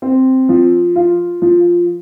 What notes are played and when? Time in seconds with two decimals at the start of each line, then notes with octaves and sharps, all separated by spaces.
0.02 C4
0.49 F3
0.96 F4
1.42 F3